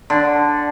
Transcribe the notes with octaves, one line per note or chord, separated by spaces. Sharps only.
D3